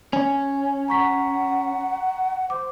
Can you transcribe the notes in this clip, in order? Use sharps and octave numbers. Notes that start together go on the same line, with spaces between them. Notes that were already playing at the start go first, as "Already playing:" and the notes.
C#4
F#5 A#5 C#6 B6
C5 D6